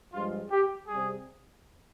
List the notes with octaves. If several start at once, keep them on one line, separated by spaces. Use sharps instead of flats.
G2 F3 G#3 F4
G4
C3 G3 G#4